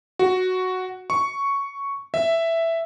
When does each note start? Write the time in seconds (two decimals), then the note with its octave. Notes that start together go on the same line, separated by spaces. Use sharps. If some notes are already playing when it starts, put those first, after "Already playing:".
0.19 F#4
1.10 C#6
2.14 E5